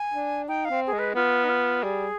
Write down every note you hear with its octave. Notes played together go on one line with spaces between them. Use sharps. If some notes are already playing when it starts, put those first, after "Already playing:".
Already playing: G#5
D4
D#4 G5
F5
C4
G#4
G#3
B4
B3 F4
D#4
F4
G3 G#4